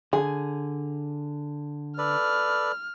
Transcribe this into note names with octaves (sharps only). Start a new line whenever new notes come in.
D3 G#4
A4 B4 D5 F6